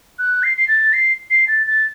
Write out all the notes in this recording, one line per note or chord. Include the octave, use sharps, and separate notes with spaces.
F#6
C7
C7
A6
C7
C7
A6
A6